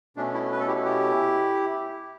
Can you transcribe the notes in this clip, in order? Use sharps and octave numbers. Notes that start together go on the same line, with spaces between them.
B2 A3 C#4 D4
E4
B4
A4
E4 G4
E4 G4